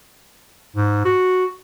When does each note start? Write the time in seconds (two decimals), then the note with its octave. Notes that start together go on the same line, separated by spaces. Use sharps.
0.76 G#2
1.05 F#4